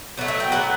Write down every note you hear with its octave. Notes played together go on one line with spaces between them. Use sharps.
B2 F#3 A3
E5
G5
B2 F#3 A3 F#5